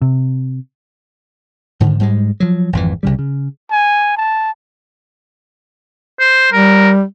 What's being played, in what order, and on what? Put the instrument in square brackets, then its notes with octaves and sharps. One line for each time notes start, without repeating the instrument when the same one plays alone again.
[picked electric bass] C3
[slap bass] G#2 D3 D#3
G#2 G3 G#3
F3 F#3
G#1 F2 E3
C2 C#3 G3
C#3
[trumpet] G#5
A5
[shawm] C5
[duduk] G3 [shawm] A#4